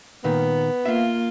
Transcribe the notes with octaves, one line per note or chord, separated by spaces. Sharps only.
A#2 D#3 B3
A#3 F4 E5 F5